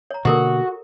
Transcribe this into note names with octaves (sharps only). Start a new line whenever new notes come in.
C#5 A#5
B2 D3 A#3 F#4 G4 A4 A#4